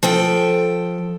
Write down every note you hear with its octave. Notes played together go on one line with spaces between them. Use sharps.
F3 A4 G5